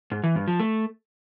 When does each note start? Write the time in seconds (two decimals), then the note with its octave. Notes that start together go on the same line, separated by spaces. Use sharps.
0.12 G#2
0.24 E3
0.36 G2
0.48 F3
0.60 A3